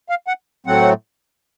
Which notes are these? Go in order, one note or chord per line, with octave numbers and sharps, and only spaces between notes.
F5
F#5
A2 F#3 A3 C4 F#5